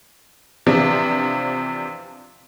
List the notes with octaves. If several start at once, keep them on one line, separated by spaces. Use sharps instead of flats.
C3 E3 F3 D4